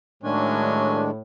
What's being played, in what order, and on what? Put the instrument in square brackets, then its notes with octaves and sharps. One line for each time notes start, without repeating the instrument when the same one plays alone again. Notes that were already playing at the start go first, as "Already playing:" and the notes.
[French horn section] A2 [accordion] D#3 G#3 D4 [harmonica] F#3 C#4